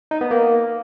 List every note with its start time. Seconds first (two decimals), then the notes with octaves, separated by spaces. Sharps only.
0.11 D#4
0.21 B3
0.31 A#3